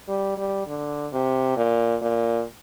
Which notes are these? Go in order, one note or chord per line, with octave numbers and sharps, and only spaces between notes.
G3
G3
D3
C3
A#2
A#2